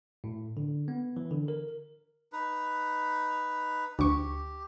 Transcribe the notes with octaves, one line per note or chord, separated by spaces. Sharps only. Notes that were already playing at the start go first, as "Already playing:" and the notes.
A2
D3
B3
E3
D3
A#4
D#4 B4
D2 G4 C#6